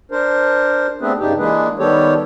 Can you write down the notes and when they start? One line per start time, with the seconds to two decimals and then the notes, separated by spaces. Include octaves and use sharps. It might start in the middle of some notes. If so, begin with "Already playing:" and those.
0.11 D4 A#4 C5
1.01 A3 B3 C4 D4 G#4 B4
1.19 G2 C#3 D4 D#4 G4
1.38 E3 G#3 A#3 D4 G#4 B4
1.79 D#3 G3 B3 G4 A4 C#5